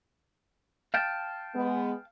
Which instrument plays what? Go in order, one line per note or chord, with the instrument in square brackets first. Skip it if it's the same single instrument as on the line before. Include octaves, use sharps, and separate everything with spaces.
[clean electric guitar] F5 G5 A5
[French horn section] G#3 B3